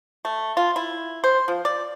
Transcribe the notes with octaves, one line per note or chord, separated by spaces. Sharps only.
A3
F4
E4
C5
F3
D5